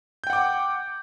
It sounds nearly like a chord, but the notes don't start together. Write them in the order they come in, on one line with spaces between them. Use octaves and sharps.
G6 G5 F#5 D6